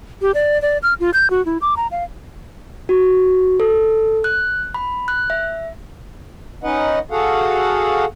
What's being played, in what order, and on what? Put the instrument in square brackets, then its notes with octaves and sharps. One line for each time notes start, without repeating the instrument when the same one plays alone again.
[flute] G4
D5
D5
F6
F4
G6
F#4
E4
D6
A#5
F5
[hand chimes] F#4
A4
F#6
B5
F#6
E5
[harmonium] C#4 D#4 B4 D#5 F#5
F#4 G#4 A4 F5 F#5